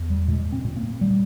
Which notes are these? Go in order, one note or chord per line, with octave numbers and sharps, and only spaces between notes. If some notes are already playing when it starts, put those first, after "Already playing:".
Already playing: E2
G3
A#2 G#3
C4
A#2
A#3
G3